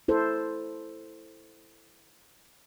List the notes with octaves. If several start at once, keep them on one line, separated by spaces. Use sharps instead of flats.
E4 A4 C5